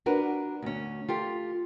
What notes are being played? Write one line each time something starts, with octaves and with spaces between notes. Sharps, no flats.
D4 F#4 A#4 B4
D2 C#4
F4 G4 A4